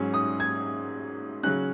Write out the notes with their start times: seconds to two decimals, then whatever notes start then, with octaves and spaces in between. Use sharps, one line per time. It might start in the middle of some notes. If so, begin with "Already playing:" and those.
Already playing: G#2 F#3 C#4
0.14 D#6
0.40 G#6
1.43 C#3 F#3 C#4 F#6